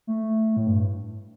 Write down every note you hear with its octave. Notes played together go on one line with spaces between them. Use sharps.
A3
A2
G2